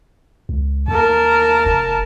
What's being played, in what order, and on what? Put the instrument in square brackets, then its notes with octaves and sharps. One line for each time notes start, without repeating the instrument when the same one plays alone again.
[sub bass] C#2
[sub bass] D#2 [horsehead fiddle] A#4 A5
[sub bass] F1